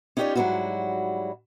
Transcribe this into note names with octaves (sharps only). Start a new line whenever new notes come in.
C#4 D#4 F4 G4 C#5 D5
G#2 F#3 G3 C#4 E4 F#4